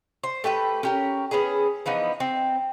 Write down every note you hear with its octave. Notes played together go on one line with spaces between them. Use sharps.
C5
A3 G4 B4 G5
C#4 G4 A#4
B3 C#4 E4 G#4
E3 F3 B3 D#4
C4